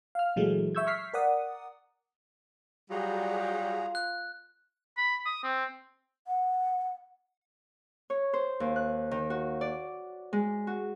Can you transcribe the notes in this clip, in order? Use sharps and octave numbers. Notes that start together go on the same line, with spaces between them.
F5 F6
A#2 E3 F#3 G#3 A3
E5 C#6 E6 G6 G#6
C#6 F6 B6 C7
A#4 D5 F#5 D#6
F#3 G3 F4 F#4 G#4 A#5
F#6
B5
D#6
C4
F#5
C#5
C5
D#2
F#6
D#3
F#4
D5
G#3
F#4